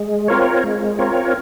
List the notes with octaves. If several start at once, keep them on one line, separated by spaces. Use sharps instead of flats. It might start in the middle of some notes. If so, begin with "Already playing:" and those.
Already playing: G#3
C4 F4 A#4 C#5
G#3
C4 F4 A#4 C#5